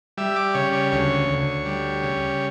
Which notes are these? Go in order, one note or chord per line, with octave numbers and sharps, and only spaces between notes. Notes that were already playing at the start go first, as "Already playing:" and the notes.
G3 E5
D5
C#3 C#5
C#5
D2 C#5
D2
G3
C#3